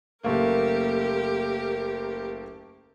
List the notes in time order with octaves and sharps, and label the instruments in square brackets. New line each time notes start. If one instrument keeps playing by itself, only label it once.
[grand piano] F#1 A3 A#3 [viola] G4 A#4